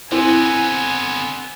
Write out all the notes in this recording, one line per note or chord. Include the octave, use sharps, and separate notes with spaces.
D3 B3 C4 E4 G#5